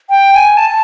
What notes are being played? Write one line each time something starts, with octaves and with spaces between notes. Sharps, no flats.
G5
G#5
A5